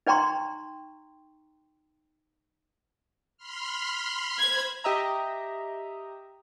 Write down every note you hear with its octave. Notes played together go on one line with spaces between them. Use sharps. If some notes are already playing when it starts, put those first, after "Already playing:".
D#4 D5 G5 A#5 C6 C#6
B5 C6 F6
C5 B5 G#6
G4 D#5 E5 A#5